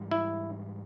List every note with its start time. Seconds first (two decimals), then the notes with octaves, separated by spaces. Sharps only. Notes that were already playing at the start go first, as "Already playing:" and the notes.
Already playing: G#2 E3 G3
0.11 E4